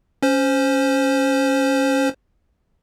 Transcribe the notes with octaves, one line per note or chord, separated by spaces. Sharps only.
C#4 C5